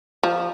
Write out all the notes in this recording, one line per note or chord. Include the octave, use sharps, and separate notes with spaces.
F3